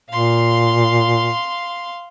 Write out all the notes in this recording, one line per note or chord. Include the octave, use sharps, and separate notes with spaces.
A#2 F5 C6